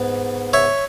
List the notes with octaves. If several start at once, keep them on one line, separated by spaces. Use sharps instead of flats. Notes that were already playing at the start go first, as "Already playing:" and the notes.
Already playing: G#2 B3
C#5 E5